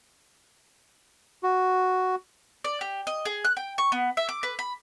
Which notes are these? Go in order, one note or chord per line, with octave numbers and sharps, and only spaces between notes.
F#4
D5
G4
D#5
G#4
F#6
G5
C#6
B3
E5
D6
B4
B5